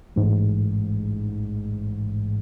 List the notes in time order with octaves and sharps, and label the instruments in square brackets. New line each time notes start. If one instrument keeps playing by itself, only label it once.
[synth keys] A1 G#2